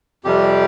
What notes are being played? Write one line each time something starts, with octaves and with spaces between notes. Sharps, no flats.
F2 C3 G3 G4